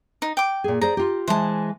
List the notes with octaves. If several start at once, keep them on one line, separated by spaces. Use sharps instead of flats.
D#4
G5 D6
A#2 G#4
G#4 C5 D5 A#5
F4 G4
E3 G#3 C5 A5